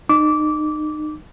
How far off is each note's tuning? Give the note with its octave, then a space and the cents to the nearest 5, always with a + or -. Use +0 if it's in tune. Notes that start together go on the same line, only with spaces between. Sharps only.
D#4 -30 D6 -15